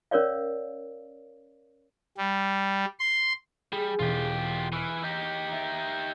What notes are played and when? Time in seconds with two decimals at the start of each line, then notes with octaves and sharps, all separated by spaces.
0.11 C#4 A#4 C#5 D5 F5
2.17 G3
2.99 C6
3.72 G3 G#4
3.99 E1 F4 G4
4.72 E3 C#6 E6 F6
5.03 D#4 G4
5.48 E5 D7